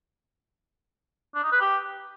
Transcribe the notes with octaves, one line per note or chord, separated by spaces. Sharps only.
D4
D#4
B4
G4